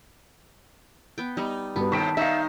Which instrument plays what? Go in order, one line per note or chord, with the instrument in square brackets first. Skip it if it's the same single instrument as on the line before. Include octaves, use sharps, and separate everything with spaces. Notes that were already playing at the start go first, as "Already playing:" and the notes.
[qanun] B3 G5
[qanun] G3 B3 [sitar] D#4
[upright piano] G2 F#4 B4 [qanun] B3
[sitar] A2 C3 [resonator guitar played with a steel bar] D#3 A5 [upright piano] C#6 B6 D7
[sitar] D#3 [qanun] D#4 C#5 [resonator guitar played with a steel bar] E5 F5